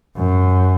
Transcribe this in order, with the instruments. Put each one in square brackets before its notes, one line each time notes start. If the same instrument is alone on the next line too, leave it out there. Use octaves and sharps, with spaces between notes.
[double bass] F#2